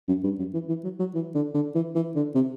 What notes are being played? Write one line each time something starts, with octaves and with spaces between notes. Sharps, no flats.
F#2
G2
F#2
E3
E3
F#3
F#3
E3
D3
D3
E3
E3
D3
C3